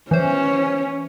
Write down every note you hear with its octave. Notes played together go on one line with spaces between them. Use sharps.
E3 C#4 C5